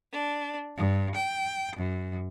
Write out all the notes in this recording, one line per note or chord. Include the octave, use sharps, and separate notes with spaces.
D4
G2
G5
F#2